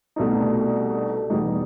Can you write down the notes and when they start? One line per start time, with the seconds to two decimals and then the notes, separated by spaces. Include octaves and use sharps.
0.16 C2 B2 A3 D#4
1.30 E2 B2 G3 D#4